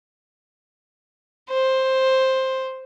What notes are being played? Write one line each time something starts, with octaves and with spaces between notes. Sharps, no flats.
C5